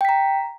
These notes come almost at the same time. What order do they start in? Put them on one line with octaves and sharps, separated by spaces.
G5 B6 A#5